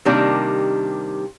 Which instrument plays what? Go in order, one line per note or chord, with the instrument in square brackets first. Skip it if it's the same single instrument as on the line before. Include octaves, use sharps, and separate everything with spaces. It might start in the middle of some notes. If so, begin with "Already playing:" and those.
[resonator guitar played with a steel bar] C3 D#3 G3 A#3 D4